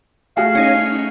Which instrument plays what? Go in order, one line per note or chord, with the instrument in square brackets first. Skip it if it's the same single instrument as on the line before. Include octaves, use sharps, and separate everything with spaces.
[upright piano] A3 F#4 G#4 [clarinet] F5
[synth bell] C#4 D#4 C#5